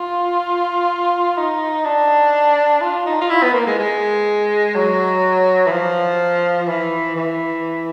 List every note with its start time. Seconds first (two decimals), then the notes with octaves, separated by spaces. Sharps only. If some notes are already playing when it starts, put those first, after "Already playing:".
Already playing: F4
1.37 D#4
1.85 D4
2.81 F4
3.06 D#4
3.21 F4
3.30 E4
3.43 B3
3.54 A#3
3.67 G#3
3.79 G#3
4.75 F#3
5.67 E3
5.72 F3
6.68 E3
7.16 E3